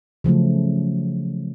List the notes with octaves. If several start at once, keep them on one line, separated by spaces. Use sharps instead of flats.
C#3 F3 F#3 A3